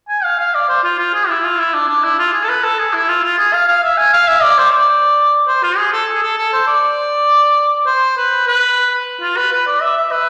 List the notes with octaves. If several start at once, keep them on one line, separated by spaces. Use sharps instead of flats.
G#5
F5
F5
D5
C5
F4
F4
G#4
E4
F4
E4
D4
D4
E4
F4
G#4
A4
B4
A4
G#4
E4
F4
F4
G#4
F5
F5
E5
G#5
F5
E5
D5
C5
D5
C5
F4
G#4
A4
G#4
A4
A4
C5
D5
C5
B4
B4
F4
B4
B4
D5
E5
E5
B4